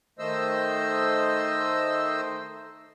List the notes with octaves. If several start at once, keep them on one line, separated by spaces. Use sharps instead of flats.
D#3 A3 C5 D#5 E6